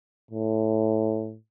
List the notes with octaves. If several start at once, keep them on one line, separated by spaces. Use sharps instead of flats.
A2